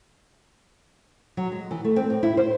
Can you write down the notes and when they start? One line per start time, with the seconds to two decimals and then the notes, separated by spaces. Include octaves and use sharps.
1.37 F#3
1.52 G#3
1.71 E3
1.84 A3
1.96 C4
2.10 A2
2.23 E4
2.37 C5